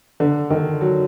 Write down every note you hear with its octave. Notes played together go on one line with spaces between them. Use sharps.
D3
D#3
F#3